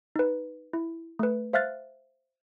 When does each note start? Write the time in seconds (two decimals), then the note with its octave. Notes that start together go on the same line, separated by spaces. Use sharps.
0.16 D#4 B4
0.73 E4
1.19 A3 B4
1.53 C5 E5 F5 F6 F#6 A6